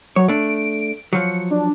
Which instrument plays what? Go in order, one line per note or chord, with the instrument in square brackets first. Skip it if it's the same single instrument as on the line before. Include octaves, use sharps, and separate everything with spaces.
[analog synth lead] F#3 [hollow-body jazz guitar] C#5
[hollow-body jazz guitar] A3 D4 [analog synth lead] D7
[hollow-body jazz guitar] F3 F#3 [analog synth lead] C#7
[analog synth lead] D4